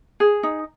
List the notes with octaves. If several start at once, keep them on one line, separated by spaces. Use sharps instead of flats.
G#4
D#4